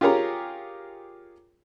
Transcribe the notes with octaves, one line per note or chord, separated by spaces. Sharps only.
F4 G4 G#4 A#4 C#5 A#5